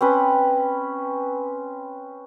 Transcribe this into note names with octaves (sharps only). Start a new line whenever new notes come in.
C4 C#4 B4